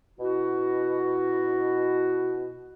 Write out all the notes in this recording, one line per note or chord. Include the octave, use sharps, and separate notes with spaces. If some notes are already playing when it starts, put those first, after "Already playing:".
B2 E4 F#4